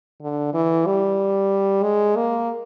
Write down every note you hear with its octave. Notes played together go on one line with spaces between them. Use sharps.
D3
E3
G3
G#3
A#3